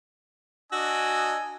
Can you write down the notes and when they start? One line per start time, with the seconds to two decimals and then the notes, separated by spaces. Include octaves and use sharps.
0.72 D4 F#4 D#5 G#5 E6